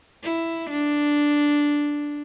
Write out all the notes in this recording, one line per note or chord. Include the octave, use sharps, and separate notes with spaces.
E4
D4